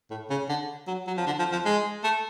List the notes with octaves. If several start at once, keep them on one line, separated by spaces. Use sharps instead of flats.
A2
C#3
D3
F#3
F#3
F3
D3
F3
F3
G#3
A3